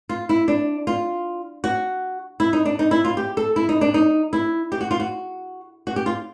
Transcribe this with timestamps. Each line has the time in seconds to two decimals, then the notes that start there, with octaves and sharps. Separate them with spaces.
0.09 F4
0.29 E4
0.48 D4
0.87 F4
1.64 F#4
2.40 E4
2.53 D#4
2.65 D4
2.79 D#4
2.91 E4
3.05 F4
3.17 G4
3.37 A4
3.56 E4
3.69 D#4
3.81 D4
3.94 D#4
4.33 E4
4.72 G4
4.81 F#4
4.91 F4
5.00 F#4
5.87 F#4
5.96 G4
6.06 F4